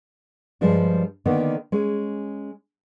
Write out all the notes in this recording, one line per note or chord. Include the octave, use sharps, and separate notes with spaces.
G2 F3 G3 G#3 D4
D3 D#3 A#3 B3
G#3 C#4